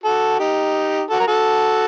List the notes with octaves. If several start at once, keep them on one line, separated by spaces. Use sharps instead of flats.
F#4 A4
D#4 G4
F#4 A4
A#4
F#4 A4